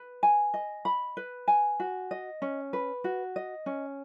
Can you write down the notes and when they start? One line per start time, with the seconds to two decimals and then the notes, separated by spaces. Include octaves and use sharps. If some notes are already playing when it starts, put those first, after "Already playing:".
Already playing: B4
0.23 G#5
0.54 D#5
0.85 B5
1.17 B4
1.48 G#5
1.80 F#4
2.11 D#5
2.42 C#4
2.73 B4
3.04 F#4
3.36 D#5
3.66 C#4